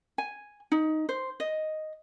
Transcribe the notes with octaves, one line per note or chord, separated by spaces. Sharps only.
G#5
D#4
C5
D#5